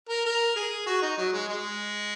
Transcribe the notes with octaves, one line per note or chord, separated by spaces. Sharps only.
A#4
A#4
G#4
F#4
D#4
F#3
G#3
G#3